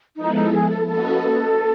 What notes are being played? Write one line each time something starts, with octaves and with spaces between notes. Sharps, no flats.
F3 G#3 B3 D#4 E4 A4
D#4
G#4
A4
A#3 C#4 F#4 A4 B4 D#5